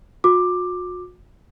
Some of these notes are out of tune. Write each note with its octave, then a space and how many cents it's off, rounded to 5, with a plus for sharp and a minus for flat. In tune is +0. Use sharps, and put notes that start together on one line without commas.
F#4 -45 D6 +10